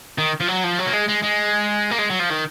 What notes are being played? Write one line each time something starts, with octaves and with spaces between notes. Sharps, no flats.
D#3
F3
F#3
F3
F#3
A#3
G#3
G#3
G#3
A#3
G#3
F#3
F3
D#3